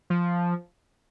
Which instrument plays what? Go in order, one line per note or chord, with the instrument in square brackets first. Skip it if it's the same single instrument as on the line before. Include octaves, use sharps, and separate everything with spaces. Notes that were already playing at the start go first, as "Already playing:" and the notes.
[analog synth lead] F3